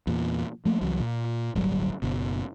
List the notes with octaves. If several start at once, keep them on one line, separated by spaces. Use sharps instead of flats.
E2 A#2
F3 A3 A#3
C2 E3 F#3
A#2
D1 G1 F#3 G3
F#1 B2